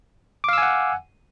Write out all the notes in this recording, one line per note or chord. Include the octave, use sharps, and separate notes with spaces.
F5 F#5 G#5 D6 E6